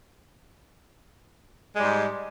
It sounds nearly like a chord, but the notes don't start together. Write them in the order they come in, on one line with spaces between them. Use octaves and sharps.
G#3 G3 G#2